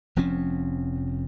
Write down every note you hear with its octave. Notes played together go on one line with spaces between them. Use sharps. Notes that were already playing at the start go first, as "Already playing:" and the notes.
F1 F3 C4 C#4